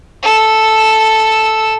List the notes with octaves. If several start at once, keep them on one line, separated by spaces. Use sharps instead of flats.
A4 E6